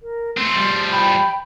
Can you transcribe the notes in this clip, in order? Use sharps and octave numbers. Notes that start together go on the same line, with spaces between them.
A#4
A3 C4 C6
F3 G3
G5 B5